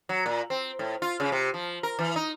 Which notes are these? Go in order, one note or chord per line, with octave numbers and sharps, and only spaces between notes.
F#3
A#2
C4
A2
F4
C#3
C3
F3
A#4
E3
D#4